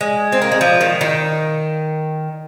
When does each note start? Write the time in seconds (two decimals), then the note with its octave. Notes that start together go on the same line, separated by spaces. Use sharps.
0.01 G#3
0.32 C4
0.42 A#3
0.52 G#3
0.61 F3
0.81 D#3
1.01 D#3